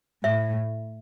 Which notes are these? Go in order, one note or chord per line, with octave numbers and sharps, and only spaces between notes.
A2 E5